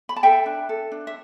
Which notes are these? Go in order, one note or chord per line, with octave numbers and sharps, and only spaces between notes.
B5
A5
A4 E5 G5
D4
A4
D4
E5